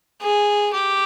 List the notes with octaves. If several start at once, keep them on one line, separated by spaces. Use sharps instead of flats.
G#4
G4